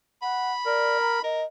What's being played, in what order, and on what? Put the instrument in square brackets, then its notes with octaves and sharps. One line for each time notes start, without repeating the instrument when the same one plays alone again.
[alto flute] F#5 [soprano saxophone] B5
[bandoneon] A#4 [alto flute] D5
[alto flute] A#5
[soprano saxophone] A#4 [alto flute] D#5